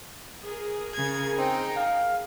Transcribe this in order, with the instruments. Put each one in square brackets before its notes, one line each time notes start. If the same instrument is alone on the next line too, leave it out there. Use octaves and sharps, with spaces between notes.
[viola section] G#4 A#4
[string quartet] C#3 G#6
[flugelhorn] C4 [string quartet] D#4 G5
[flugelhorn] F5